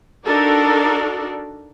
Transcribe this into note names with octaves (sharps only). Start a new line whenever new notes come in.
D4 D#4 F#4 A4 A#4 D5